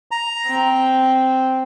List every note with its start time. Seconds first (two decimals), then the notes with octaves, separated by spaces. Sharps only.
0.11 A#5
0.48 C4